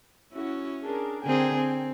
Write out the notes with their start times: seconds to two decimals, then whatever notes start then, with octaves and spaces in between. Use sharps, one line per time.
0.34 C#4 E4 F#4
0.81 D4 G#4 A#4
1.24 D3 C4 G#4 A#4 G5 G#5
1.55 C4